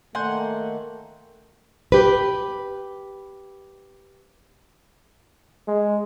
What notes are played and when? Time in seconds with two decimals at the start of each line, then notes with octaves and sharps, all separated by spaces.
0.15 D#3 A3 A#3 F#5 G#5 C6 G6
1.92 G4 B4
5.68 G#3